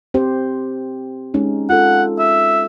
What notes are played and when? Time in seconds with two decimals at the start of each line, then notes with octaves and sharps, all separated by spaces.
0.14 C4 G4 C5
1.34 G#3 C#4 D#4
1.70 F4 A4 F#5
2.19 E5